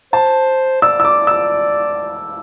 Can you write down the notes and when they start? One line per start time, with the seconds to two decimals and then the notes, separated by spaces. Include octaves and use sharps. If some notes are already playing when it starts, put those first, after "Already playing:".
0.13 C5 A5
0.82 D5 E6
1.00 E6
1.05 D6
1.27 E6